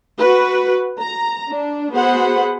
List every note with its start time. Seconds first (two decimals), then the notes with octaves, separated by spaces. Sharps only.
0.18 F#4 B4
1.01 A#5
1.51 D4
1.93 B3 F#4 G#4 C5 F#5 B5